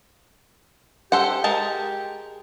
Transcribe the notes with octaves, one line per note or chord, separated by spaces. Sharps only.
G4 A4 C5 F#5
G#3 A#4 A5